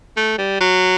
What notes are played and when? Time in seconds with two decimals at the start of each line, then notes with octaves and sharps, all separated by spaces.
0.17 A3
0.38 G3
0.60 F#3